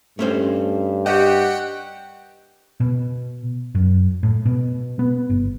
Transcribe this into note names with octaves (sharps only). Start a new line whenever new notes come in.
G2 A3 C#4 C5
C4 F#4 G4 D#5 F#5 G5
B2
F#2
A2
B2
B3
G1